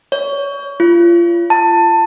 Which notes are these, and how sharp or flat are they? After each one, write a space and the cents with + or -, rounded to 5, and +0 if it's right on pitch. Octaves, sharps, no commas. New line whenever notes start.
C#5 +25
F4 -30
A5 +20